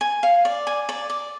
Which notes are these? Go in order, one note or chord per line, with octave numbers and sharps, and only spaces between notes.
G#5
F5
D5
G#5
D5
D5